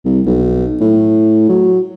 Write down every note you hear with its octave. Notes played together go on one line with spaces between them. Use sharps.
C2
B1
A2
F#3